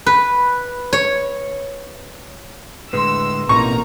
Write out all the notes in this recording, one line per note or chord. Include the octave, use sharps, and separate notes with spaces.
B4
C#5
A2 D3 G#3 B4 C6 E6
A1 B2 A#3 C4 D#4 A#5 C#6